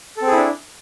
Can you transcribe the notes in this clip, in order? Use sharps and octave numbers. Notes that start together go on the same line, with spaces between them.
C4 D4 E4 G#4 A4